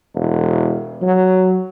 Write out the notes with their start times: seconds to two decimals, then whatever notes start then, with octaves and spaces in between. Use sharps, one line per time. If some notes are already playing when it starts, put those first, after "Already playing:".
0.15 E1
1.02 F#3